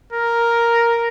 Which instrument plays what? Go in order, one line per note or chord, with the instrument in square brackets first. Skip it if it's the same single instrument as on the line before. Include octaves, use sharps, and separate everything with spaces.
[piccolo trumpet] A#4